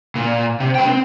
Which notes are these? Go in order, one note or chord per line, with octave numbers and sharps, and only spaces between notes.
A#2
C3
B4 G5
C4